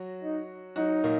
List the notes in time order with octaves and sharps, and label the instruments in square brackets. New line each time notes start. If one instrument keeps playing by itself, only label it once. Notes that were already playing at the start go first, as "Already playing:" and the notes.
Already playing: [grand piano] F#3 F#4
[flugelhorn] D#4
[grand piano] F#3 F#4 [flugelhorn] D#4
[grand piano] A#2 A#3